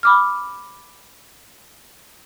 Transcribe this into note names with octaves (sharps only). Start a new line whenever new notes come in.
B5 D6 F6